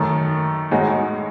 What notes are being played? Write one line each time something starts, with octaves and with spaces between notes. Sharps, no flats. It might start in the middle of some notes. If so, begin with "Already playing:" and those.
Already playing: F#2 D#3 A3
A2 G#3 D#4 F#4